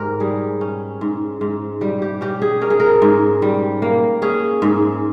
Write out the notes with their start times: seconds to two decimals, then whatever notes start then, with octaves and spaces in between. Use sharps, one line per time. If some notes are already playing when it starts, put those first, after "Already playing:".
Already playing: G#2 G4 A#4
0.20 G3 G#4
0.61 C#4
1.01 G#2
1.41 G#2
1.81 G3 G4
2.02 G4
2.21 C#4 G4
2.42 G#4
2.61 C#4 A#4
2.70 G#4
2.80 A#4
3.02 G#2
3.42 G3
3.82 A#3
4.22 C#4 G#4
4.62 G#2